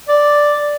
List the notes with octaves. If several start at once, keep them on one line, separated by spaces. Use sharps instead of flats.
D5